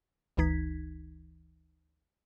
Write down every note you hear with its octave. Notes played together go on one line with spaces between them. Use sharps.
G1 D2 E3 D#4 G#6 B6